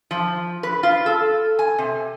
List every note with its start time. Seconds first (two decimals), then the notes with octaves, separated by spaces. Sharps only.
0.11 F3
0.63 B4
0.83 F4
1.06 A4
1.59 G#5
1.78 C3